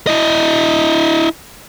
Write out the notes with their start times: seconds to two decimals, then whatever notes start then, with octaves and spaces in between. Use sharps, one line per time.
0.07 E4 D#5